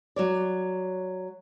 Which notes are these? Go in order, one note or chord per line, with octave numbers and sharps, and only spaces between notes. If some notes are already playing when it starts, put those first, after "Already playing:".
F#3 C#5 D5